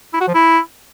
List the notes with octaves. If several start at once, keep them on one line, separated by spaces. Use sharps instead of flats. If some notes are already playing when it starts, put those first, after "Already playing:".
E4
F#4
F3
E4